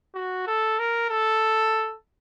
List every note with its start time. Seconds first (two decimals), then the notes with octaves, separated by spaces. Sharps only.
0.14 F#4
0.47 A4
0.79 A#4
1.09 A4